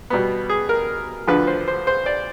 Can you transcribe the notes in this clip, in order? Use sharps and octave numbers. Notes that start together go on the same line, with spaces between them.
B2 G3 B3
G#4
A#4
D2 D3 F3 B4
C5
C5
C5
D5